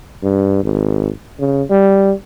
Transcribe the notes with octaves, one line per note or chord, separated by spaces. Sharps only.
G2
G#1
C#3
G3